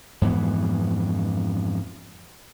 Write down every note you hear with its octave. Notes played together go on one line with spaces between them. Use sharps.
F2 G#2 E3 B3